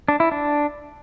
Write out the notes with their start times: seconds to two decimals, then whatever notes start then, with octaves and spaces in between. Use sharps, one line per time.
0.08 D4
0.20 E4
0.32 D4